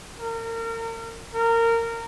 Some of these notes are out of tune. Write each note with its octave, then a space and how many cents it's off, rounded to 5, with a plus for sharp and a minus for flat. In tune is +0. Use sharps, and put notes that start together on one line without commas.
A#4 -35
A#4 -20